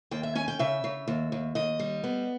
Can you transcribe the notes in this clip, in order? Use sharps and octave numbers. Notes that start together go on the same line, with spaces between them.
D#2 G5
E5
C#4 G#5
G5
C#3 E5
C#3
D#2
D#2
D#2 D#5
G3
B3